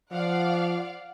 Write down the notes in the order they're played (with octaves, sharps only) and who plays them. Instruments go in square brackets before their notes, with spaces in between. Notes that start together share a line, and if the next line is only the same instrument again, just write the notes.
[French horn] F3 [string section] D5 F5 F#5